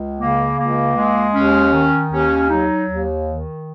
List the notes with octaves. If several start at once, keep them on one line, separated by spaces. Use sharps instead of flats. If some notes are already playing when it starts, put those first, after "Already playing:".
Already playing: C#2
C#3 A#3
C#2 A#3
G#3
D#2 C#4
D#3
D#2 C#4
F#3 D#4
D#2
D#3